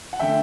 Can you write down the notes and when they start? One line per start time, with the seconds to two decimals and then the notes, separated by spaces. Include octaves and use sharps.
0.13 F#5
0.19 D3 A3 E5 G5